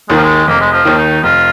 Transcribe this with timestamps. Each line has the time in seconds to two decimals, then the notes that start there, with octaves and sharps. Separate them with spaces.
0.09 D#2 D#3 G#3
0.16 F3
0.24 G#3
0.48 F1 A#3
0.61 G#3
0.73 F3
0.85 D#2 D#3
0.98 D#4
1.23 F1 F4